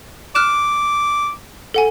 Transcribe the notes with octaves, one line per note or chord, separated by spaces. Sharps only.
D6 F6 F#6 E7
A4 F#5 G#5